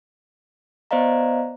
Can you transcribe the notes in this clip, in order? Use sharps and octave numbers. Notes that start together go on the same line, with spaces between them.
B3 C5 D5 D#5 F5 A#5